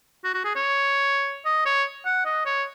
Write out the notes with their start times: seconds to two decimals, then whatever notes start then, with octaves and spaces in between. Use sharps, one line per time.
0.24 F#4
0.34 F#4
0.44 G#4
0.55 C#5
1.45 D#5
1.66 C#5
2.06 F#5
2.25 D#5
2.46 C#5